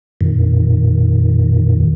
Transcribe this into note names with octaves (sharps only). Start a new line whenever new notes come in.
F2 A#2 D#3